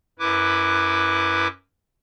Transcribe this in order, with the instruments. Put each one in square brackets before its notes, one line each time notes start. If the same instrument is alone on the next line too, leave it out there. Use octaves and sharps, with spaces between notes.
[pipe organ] F#2 E4 B4 D6